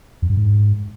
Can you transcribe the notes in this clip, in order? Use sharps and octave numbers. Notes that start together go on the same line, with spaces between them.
F2
G2
G#2